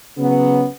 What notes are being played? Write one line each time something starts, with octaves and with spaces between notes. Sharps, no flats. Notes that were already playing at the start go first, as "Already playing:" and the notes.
C#3 F#3 B3